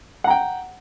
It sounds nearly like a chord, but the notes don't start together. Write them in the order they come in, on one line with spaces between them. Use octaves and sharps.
F#5 A#5 G5